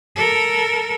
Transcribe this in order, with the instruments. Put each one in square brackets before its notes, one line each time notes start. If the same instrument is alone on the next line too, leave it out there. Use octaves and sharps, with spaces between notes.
[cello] A4 A#4